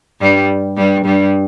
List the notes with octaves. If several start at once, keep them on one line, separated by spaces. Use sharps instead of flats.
G2 G3
G2 G3
G2 G3